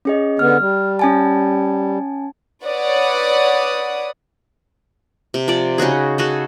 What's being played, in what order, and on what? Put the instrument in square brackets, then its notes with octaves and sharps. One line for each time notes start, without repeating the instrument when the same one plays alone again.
[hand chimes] C#4 G#4 D#5
[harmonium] D3 B3 [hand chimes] F6
[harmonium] G3
[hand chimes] C#4 G#5 A5
[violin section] B4 C#5 D5 F#5 D#6
[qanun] C3
F3 D5
C#3 D#4 F#4 G#4
F#4 G#4 A4